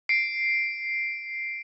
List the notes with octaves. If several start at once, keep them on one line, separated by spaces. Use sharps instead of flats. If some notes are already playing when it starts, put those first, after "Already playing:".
C7 D7